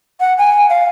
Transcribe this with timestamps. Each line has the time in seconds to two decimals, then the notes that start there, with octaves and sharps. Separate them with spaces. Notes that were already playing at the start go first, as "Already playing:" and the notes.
0.20 F#5
0.38 G#5
0.69 F5